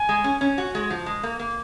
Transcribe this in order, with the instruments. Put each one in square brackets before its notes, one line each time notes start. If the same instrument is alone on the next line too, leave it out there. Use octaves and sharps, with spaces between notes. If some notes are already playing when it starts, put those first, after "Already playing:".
Already playing: [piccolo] G#5
[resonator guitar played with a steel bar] G#3
C#4
C#4
F#4
G#3
F3
G#3
A#3
A#3